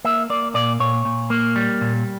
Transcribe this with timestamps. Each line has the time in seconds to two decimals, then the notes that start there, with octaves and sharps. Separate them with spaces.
0.04 A#3 E5
0.30 A#3 D5
0.54 A#2 D5
0.80 A#2 C#5
1.05 A#2
1.30 A#3
1.56 G3
1.81 A#2